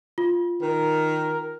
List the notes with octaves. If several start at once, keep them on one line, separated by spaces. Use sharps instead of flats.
F4
D#3 A#4